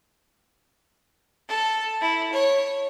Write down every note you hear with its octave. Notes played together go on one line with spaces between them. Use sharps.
A4
E4
C#5